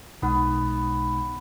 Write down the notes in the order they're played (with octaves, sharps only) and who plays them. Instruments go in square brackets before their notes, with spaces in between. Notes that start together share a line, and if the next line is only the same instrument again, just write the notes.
[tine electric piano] B1 B2 G#3 D#4 [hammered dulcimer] B3